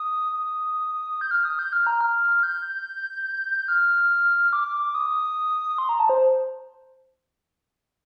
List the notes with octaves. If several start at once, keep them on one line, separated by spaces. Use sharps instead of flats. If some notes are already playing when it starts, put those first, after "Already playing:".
Already playing: D#6
D#6
G6
F6
D#6
G6
F6
A#5
F6
G6
F6
D6
D#6
C6
A#5
A5
C5